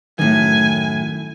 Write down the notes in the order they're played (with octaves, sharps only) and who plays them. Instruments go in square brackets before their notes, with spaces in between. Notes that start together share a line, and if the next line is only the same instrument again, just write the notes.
[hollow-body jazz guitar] F#2 A2 [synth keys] D#3 [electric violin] G#5